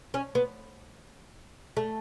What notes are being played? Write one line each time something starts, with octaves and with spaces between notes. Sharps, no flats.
C#4
B3
A3